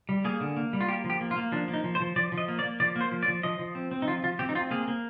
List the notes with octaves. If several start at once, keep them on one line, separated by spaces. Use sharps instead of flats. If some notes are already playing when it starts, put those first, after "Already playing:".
G3
A#3 G#4
D3
A#3
G3
F4
A#3 G4
F3
G4
A#3
F4
A#3
F3 D4
A#3
D#4
F3
C5
F3
F3 D5
F3
D#5
A#3
D5
A#3
F3 D5
A#3 C5
F3
D5
F3
F3 D#5
F3
C4
C4
D#4
F3 F4
F3 F4
C4 G4
D#4
C4 F4
A#3 G#4
A#3